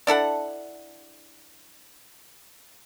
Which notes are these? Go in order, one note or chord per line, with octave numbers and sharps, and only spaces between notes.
D4 E4 A4 F#5